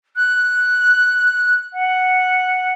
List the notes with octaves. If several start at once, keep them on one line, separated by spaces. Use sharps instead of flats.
F#6
F#5